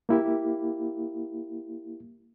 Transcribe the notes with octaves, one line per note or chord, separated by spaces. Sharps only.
A#3 E4 G4